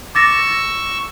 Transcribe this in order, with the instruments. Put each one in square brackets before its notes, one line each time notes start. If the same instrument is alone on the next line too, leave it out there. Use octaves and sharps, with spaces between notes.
[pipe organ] C#6 E6 [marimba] D6 A6 A#6